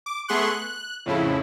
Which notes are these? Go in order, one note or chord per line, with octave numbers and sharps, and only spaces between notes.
D6
A3 B3 G#4 C6 C#6 F#6
F#6
F2 A2 C#3 E4